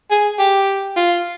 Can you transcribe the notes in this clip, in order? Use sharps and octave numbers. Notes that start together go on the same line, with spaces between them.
G#4
G4
F4